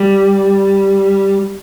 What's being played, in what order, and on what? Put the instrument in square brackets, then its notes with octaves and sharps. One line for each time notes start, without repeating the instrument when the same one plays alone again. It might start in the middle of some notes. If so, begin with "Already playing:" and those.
Already playing: [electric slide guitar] G3